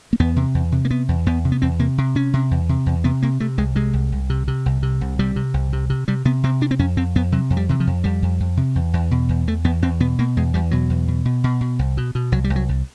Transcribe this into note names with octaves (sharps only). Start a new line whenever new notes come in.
A#3
E2 B3
C3
E2
C3
A#3
C3 B3
E2
E2 B3
C3
B3
E2 C4
C3 A#3
C3
C3 C#4
C3
E2
C3
E2
C3 B3
C3 A#3
C3 A3
C2 G#3
C3 G#3
C2
C2
C3
C3
C2
C3
C2
C3 G3
C3
C2
C3
C3
C3 G3
C3 B3
C3 C4
C3 D4
C4
F2 C#4
F2 C4
F2 B3
C3 F#3
F2
G3
C3 E3
F3
F2
F2 G3
F2
F2
C3
E2
E2
B2
E2
E2 A3
E2 B3
E2 C4
B2 B3
B2 A#3
E2 G#3
E2 G3
B2 F#3
E2
B2
B2
B2
B2
C2
B2
B2
C2 F#3
G3
C2
F#3
C2